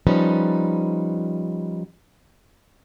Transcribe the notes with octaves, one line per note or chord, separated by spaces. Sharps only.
F3 G3 C#4 D#4 B4